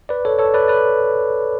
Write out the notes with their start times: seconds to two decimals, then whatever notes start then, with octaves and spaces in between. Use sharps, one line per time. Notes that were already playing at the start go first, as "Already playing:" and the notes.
0.09 B4 D5
0.25 A4 C#5
0.39 A4 C#5
0.54 B4 D5
0.68 B4 D5